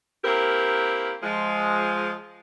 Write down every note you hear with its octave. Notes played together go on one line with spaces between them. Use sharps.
A#3 C4 E4 G4 A#4
F3 G#3